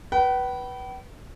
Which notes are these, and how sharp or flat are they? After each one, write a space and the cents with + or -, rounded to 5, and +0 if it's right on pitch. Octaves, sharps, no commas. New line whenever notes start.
B4 -10 G5 -45